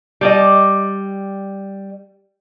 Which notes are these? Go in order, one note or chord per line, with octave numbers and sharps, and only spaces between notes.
G3 D5 D#5